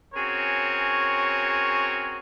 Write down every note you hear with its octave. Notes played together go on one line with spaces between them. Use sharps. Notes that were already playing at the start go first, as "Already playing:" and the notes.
C4 C#4 F#4 G#4 A#4 C#5